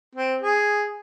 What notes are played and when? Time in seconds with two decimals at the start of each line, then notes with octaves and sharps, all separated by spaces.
0.15 C4
0.41 G#4